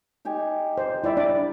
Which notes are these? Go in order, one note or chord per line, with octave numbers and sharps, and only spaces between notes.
D#4 G4 G#5
C5
G3 E4 D5 E5
D4 D5